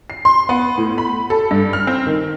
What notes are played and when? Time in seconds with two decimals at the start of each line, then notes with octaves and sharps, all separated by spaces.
0.10 C7
0.25 C6
0.49 B3
0.78 A2
0.98 B5
1.30 A4
1.51 G2
1.73 F6
1.87 C4
2.07 D#3